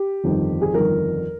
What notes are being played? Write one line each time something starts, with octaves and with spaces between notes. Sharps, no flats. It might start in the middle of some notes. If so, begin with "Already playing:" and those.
Already playing: G4
G1 F2 D#3
G#4
G1 F2 D#3 A#4